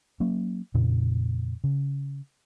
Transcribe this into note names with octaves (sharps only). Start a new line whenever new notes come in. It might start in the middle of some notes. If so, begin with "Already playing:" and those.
F#3 A#3 C#4
F2 A#2 C#3
C#3